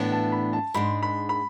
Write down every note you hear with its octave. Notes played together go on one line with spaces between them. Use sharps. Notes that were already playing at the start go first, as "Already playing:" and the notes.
Already playing: A2 E3 B3 D4 A4
A5
B5
A5
G#2 G#3 D4 B5
B5
B5